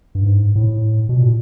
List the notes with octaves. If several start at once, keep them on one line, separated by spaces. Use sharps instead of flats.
G2
G#2
A2
B2
A#2